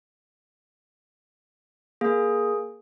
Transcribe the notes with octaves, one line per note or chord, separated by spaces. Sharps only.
A#3 G#4